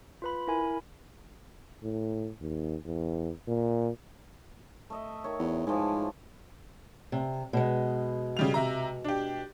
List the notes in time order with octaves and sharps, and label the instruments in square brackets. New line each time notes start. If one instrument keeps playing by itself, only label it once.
[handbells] F4 B4 B5
E4 A#4 G#5 B5
[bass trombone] A2
D#2
E2
A#2
[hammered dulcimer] A3 D#5 E5
D#3 C#5
[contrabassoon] E2
[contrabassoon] G#2 [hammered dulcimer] E3 F3
[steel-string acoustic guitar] C3
B2 G#3
[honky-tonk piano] C#3 G3 F7
C3 E5 A#5
D4 G4